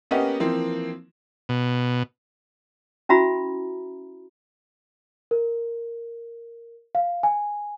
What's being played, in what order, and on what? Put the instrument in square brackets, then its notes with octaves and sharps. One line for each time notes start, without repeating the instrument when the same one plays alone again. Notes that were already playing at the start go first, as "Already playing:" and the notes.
[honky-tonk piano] A#3 B3 C#4 G4 D#5 F#5
E3 F3 A#3 C4
[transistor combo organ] B2
[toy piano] C#4 E4 F#4 E5 A#5 B5
[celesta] A#4
F5
G#5